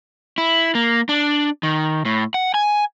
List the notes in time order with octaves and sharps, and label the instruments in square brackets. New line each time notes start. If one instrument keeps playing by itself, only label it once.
[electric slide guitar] E4
A#3
D4
D#3
A2
F#5
G#5